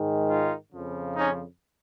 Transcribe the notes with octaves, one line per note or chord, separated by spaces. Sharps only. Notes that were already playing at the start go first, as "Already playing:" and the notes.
Already playing: G#2 D#3 G#3
D#4 F4
F2 C#3 F3
C#4 D#4